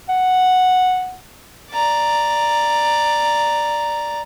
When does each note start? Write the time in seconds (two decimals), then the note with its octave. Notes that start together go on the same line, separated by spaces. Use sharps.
0.09 F#5
1.71 D5 A#5